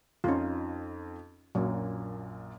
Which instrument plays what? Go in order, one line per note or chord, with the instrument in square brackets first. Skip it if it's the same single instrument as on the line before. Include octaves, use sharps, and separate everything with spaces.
[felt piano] F2 D#4 [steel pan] C#4 F4
[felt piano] A#1 F#2 A#2 [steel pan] F#3